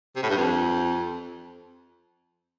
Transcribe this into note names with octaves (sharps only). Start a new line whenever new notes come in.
C3
A2
G2
F2